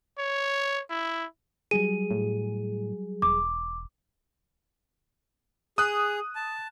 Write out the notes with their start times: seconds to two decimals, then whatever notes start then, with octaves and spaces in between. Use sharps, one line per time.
0.18 C#5
0.90 E4
1.71 F#3 G3 G#4 D#7
2.11 A2
3.22 E1 D6
5.78 G#4 D#6 F#6
6.35 A5